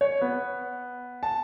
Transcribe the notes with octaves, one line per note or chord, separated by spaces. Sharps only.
C#5
B3
A5